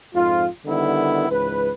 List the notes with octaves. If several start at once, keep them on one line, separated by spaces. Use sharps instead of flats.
F2 G#2 F4
D3 D#3 G3 B3 E4
C#2 G#2 E3 B4